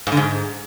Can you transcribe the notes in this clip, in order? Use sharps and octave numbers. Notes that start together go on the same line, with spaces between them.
G#2
D3
G#2